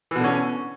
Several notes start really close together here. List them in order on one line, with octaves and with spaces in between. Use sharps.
E3 B2 D3 C#4